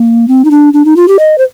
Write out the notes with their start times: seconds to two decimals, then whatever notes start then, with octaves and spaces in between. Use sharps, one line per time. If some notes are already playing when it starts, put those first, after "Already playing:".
Already playing: A#3
0.28 C4
0.45 D#4
0.51 D4
0.73 D4
0.85 D#4
0.96 F4
1.08 G4
1.19 D#5
1.38 C5